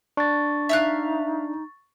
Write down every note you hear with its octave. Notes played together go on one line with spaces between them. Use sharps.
D4 C#6 A6
D#4 E5 F5 F#6